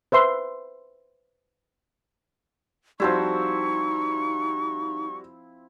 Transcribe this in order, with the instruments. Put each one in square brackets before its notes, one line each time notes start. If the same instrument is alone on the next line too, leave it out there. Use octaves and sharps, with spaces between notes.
[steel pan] B4 C5 E5 C6
[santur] F3 C4 E4 [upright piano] G3 F#4 C5 [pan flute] D#4 [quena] C#6